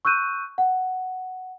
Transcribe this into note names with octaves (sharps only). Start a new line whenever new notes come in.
C#6 E6 F#6 G6 D#7
F#5